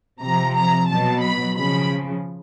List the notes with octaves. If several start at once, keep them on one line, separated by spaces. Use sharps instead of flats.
C3 F3 A#5
A#5
B2 F#3 A5
B5
C#3 F3 B5